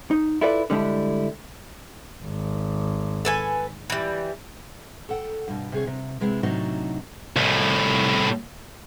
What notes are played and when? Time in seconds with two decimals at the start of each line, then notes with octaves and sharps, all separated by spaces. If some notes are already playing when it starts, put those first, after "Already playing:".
0.11 D#4
0.41 E4 F4 A4 B4 D5
0.70 D3 G3 G#3 D4 E4
2.24 G#1
3.25 A4 B4 G#5
3.90 E3 G3
5.09 A4 F#5 G5
5.48 G2 B2
5.72 C3 G#4 C#5
5.87 C3
6.21 C3 G#3 B3 C4 E4
6.43 A2 C3 F#3 D4 D#4 F#4
7.36 C2 A2